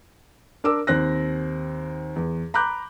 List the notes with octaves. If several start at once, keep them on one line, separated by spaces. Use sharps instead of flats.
D4 A#4 D6 E6
D#2 C4 F#6 A#6
E2
A#5 B5 D6 F#6 G6